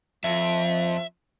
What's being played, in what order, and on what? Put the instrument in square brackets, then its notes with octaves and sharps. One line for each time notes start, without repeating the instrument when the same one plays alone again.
[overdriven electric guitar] F2 [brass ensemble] F3 [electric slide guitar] E5